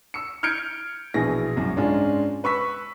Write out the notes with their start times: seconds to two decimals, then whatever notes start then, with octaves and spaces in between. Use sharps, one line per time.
0.14 E6 C#7
0.43 F6 G6 G#6 C#7 D7
1.14 A#1 B2 E3 G#4 A#6
1.56 C2 F#2
1.76 G#2 G#3 C#4 D4 F4
2.44 B4 C#6 E6 B6